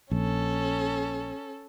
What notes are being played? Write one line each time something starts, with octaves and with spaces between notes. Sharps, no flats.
A#1 C#4 A4